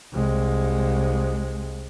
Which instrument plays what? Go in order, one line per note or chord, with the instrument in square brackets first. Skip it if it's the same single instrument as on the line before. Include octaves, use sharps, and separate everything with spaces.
[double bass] C2 G#3